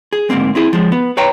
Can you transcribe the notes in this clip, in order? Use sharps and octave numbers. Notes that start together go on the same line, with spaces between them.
G#4
D2 G#2 A#3 C4
C4 E4 G#4
F3 G#3
B3
B4 C#5 F5 G5 A#5